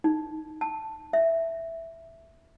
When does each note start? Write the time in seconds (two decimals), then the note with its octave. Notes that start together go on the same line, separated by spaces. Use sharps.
0.04 D#4
0.61 A5
1.13 E5